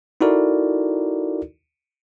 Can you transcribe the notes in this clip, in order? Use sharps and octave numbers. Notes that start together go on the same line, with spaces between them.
D#4 E4 F#4 A4 A#4 D5